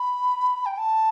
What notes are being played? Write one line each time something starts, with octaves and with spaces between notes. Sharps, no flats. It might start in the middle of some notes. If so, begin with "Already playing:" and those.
Already playing: B5
G5
A5